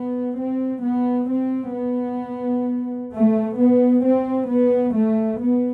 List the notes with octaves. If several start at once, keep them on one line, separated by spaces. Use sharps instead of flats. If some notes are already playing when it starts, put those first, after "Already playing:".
Already playing: B3
C4
B3
C4
B3
A3
B3
C4
B3
A3
B3